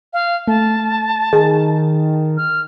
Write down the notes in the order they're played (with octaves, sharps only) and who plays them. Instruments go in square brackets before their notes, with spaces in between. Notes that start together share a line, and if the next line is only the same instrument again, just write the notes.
[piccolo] F5
[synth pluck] A3 [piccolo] A5
[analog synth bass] D#3 [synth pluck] G#4
[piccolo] F6